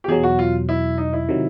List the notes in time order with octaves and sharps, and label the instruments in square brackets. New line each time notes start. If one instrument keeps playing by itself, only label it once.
[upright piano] G4
[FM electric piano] E2 B2 F#3 [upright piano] G#4
[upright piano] F#4
F4
E4
D#4
E4
[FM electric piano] C3 D#3 F#3